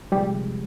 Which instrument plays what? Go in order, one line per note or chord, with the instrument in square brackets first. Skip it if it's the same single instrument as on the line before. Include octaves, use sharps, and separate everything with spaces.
[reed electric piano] C3 F3 G3 G#3 G4